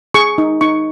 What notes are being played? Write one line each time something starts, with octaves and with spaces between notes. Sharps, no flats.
G#4 C#6
D#4
D#4 C#6